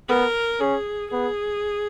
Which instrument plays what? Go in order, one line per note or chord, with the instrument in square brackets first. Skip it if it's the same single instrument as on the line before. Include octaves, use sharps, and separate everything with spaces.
[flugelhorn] B3 [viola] A#4
[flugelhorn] C#4 [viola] G#4
[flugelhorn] B3 [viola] G#4